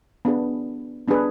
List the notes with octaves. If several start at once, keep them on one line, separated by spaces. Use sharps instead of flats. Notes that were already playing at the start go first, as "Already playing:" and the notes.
B3 D4 G#4 B4
B3 D4 G#4 B4